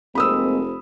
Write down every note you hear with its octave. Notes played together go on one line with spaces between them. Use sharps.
F1 G#3 A#3 C4 B5 D#6 E6